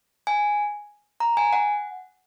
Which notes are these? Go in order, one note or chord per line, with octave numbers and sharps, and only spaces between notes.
G#5
A#5
G#5
F#5